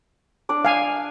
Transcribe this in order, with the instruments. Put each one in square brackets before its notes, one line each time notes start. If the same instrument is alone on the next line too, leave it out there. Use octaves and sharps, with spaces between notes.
[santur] D4 D5
[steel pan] F5 G#5